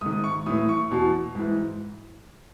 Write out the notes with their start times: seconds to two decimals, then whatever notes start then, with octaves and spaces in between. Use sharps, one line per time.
0.01 G#2 D#3 D#6
0.24 C#6
0.46 A2 E3 D#6
0.69 C#6
0.90 E2 B2
1.35 G#2 E3